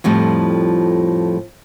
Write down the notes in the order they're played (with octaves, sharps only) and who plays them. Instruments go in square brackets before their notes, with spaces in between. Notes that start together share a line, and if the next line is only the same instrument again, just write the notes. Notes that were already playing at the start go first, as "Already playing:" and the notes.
[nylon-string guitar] F2 A2 F3 G3